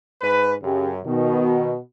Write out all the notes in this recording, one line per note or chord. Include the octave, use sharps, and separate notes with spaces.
G#2 B4
F#2 C#3 G4
B2 D#3